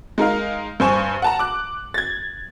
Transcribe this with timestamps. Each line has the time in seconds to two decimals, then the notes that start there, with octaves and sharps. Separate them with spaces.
0.18 G#3 D#4 A#4 F5
0.80 G2 C5 G#5 C#6 E7
1.22 F#5 A5 A#5
1.39 D6 F#6
1.94 G#6 A6